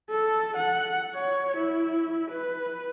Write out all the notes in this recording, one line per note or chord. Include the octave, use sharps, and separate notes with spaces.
A4
F#5
C#5
E4
B4